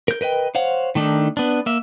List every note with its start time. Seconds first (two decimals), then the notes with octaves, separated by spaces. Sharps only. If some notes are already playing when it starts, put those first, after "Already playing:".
0.08 A#4 G6
0.21 A#4 B4 D#5 G5
0.55 C5 C#5 F5 F#5
0.95 D#3 A3 D4 D#4
1.37 B3 D4
1.66 A#3 E5